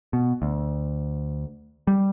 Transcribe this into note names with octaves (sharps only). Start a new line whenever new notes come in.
B2
D2
G3